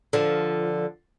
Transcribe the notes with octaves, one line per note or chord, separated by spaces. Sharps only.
D3 F3